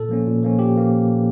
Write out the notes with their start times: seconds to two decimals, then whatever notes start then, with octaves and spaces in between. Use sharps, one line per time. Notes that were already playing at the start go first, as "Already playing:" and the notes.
Already playing: A#2 A4
0.09 F3 A#3 C#4
0.27 A#2
0.43 F3 A#3 C#4
0.59 A#2 G4
0.75 F3 A#3